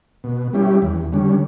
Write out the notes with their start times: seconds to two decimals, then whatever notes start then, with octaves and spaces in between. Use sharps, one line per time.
0.24 B2
0.53 G3 C#4 E4 G4
0.82 E2
1.12 D3 G3 C#4